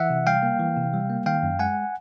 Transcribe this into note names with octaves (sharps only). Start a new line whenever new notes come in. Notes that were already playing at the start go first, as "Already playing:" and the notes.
Already playing: E3 E5 F#5
C3
G3 F5 G5
A#3
E3
C3
G3
A#3
D#3 F5 G5
F#2
G#3 F#5 G#5